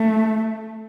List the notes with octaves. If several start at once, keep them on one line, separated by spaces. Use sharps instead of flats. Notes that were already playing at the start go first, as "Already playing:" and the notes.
Already playing: A3